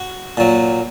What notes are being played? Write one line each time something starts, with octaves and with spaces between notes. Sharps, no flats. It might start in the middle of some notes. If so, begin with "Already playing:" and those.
Already playing: F#4
A#2 F#3